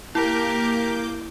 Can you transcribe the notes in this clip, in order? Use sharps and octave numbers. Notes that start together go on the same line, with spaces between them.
A#3 E4 G4 A#4 D6 G6